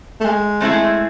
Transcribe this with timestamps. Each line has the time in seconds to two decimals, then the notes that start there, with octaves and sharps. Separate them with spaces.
0.20 A3
0.25 G#3
0.60 A3 C4 E4 G#4